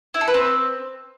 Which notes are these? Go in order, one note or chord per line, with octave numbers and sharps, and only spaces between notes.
E4
A4
B4
C4